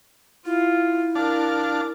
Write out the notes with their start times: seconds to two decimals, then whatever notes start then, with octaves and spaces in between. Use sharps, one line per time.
0.45 E4 F4
1.15 D4 A#4 F5 A5